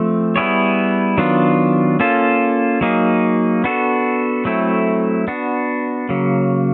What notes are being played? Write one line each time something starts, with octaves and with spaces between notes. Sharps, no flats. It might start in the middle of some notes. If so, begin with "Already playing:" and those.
Already playing: F3 A3 C4
G3 B3 E4 G#4 C#5
D#3 F#3 B3 D4 F4
A#3 C#4 F4 A4
F#3 A#3 D#4 G#4
B3 D4 F#4 A4
F#3 A3 C4 E4 A4
B3 D4 F#4
C#3 F#3 A#3